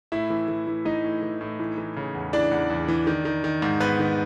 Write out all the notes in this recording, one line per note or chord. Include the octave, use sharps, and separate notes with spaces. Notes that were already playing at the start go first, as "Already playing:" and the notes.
A2 E4 E5
E3
E3
E3
E3 D#4 D#5
A2
E3
A2
E3
E3
C#3
E2
E3 D4 D5
E2
E2
E3
D#3
D#3
D#3
G#2
G#2 B3 B4
D#3